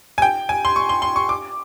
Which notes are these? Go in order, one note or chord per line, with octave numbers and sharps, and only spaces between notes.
G#5
G5
G#5
C6
C#6
C6
C6
C#6
D6